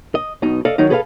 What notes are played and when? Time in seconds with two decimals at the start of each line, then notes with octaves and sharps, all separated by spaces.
0.15 D#5
0.42 B1 B2 D#4
0.65 A4 D5 D#5 F5
0.78 D#3 F#3 D#4
0.90 G#4 A4 B4 C5 F5